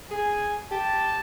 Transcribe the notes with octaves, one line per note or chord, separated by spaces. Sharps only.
G#4 G#5
G4 A5